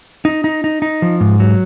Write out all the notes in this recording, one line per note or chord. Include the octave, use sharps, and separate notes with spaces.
D#4
D#4
D#4
D#4
F3
G#2
F#3